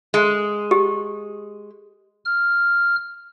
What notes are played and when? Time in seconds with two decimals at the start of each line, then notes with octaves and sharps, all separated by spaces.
0.14 G#3
0.71 G4
2.25 F6